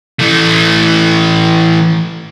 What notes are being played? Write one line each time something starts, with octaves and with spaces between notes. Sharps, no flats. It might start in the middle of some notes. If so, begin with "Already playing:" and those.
E3 A3